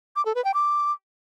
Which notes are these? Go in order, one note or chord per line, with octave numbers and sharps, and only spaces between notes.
D6
A4
B4
G5
D6